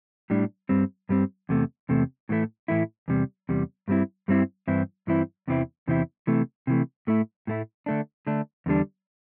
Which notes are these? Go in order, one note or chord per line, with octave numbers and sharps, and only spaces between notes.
A2 G3 D4
G2 G3 C4
G2 G3 C4
E2 C3 A3
E2 C3 A3
A2 E3 A3 E4
A2 E3 A3 E4
E2 C3 G3
E2 C3 G3
G2 G3 C4 E4
G2 G3 C4 E4
G2 E3 C4 E4
G2 E3 C4 E4
E2 C3 E3 C4 E4
E2 C3 E3 C4 E4
C3 E3 A3
C3 E3 A3
A2 A3 E4
A2 A3 E4
D3 A3 D4
D3 A3 D4
E2 D3 G3 D4